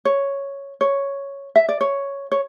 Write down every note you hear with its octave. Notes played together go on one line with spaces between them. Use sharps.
C#5
C#5
E5
D5
C#5
C#5